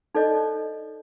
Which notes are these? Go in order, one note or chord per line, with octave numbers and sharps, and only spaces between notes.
D#4 A4 C5 D5 D#5